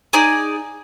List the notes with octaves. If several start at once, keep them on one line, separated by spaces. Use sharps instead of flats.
D#4 G#4 D5